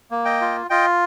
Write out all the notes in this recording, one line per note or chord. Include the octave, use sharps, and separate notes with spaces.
A#3
D#5 G5
F4
F4 D#5 G5